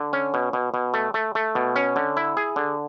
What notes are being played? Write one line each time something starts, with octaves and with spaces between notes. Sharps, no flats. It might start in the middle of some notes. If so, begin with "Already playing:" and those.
Already playing: D3
C#4
B2
B2
B2
A3
A3
A3
B2
C#4
D3
E4
G#4
D3